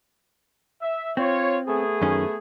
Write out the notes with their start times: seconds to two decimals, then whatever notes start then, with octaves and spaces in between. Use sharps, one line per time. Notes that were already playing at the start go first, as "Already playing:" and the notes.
0.82 E5
1.17 C4 F4 C#5
1.67 A3 B3 G#4
2.02 F#2 D#3 C#4